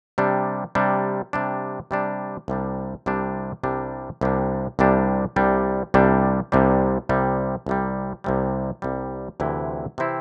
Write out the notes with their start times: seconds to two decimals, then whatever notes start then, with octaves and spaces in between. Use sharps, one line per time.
0.18 C3 G3 D4
0.75 C3 G3 D4
1.33 C3 G3 D4
1.91 C3 G3 D4
2.48 C2 C3 G3 D4
3.06 C2 C3 G3 D4
3.63 C2 C3 G3 D4
4.21 C2 C3 G3 D4
4.79 C2 C3 G3 D4
5.36 C2 C3 G3 D4
5.94 C2 C3 G3 D4
6.52 C2 C3 G3 D4
7.09 C2 C3 G3
7.66 C2 C3 G3
8.24 C2 C3 G3
8.82 C2 C3 G3
9.40 D2 C3 E3 C4 E4
9.98 C3 E3 C4 E4